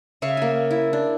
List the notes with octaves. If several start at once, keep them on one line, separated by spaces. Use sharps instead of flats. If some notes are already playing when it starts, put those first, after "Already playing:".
C#3 E5 F5 C#6
A#3 G#5
E4
D4